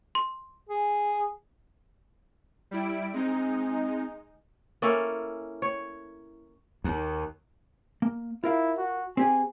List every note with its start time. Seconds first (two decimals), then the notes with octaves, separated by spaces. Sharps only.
0.15 C6
0.69 G#4
2.71 G3 E4 D7
3.13 G#3 C4 D#4
4.82 A#3 C#4 E4 A4
5.62 C#5
6.84 D#2
8.02 A#3
8.44 E4 F4 A#4 F5
8.78 F#4
9.17 C4 G4 G#4 G#5